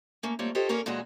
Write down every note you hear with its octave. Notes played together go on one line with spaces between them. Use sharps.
A3 A#3 C#4
G3 A3 A#3 C4 F4 C#5
F4 G4 A4 C5 C#5 D#5
A#2 A#3 C#4 A#4 C#5
A#2 E3 G#3 C#4 F#4